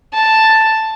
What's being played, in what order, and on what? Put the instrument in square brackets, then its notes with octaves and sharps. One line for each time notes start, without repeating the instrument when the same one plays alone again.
[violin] A5